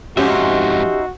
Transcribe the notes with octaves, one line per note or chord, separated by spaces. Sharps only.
F2 G#2 C#4 D#4 F#4 G4 C5 E5